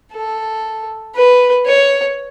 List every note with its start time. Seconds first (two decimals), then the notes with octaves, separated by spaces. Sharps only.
0.12 A4
1.16 B4
1.67 C#5